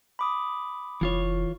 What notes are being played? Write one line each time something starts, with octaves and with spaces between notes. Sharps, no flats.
B5 D6 D#6
F1 E3 F4 C#5